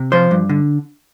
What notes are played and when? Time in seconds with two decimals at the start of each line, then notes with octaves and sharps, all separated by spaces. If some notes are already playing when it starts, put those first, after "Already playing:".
Already playing: C3
0.12 F3 C5
0.31 G2
0.49 D3